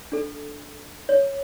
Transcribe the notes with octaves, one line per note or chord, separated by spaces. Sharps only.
D4 A4
C#5